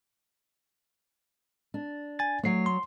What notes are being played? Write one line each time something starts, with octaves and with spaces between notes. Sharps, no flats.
D4
G#5 A6
F#3 A3 C#5 C7
C6